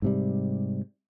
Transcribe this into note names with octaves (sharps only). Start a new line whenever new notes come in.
G#2 C3 G3